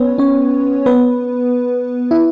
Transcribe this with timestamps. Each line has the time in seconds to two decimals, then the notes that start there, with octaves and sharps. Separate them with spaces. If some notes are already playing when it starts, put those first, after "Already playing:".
Already playing: B3 C#4 B4 C#5
0.18 C#4 C#5
0.86 B3 B4
2.11 E4